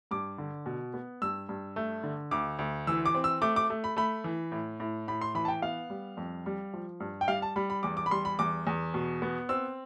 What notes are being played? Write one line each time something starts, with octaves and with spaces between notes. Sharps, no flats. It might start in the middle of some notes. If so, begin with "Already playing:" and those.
G2 D6
D3
B2
B3
G2 E6
G2
A3
D3
D2 D6
D2
E3 E6
D6
C4
E6
A3 D6
D6
A3
B5
A3 B5
E3
A2
A2
A2 B5
C6
E3 B5
A5
G5
B3 F5
G3
F2
G3
F3
G2
G5
G3 F5
A5
G3 B5
B5
E2 D6
D6
B5
G3 C6
B5
E2 D6
E2
B2
B3
C4 E6